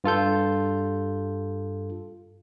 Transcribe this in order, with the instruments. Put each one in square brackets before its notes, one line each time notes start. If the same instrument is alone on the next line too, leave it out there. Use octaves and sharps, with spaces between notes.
[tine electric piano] G2 F4 A4 G6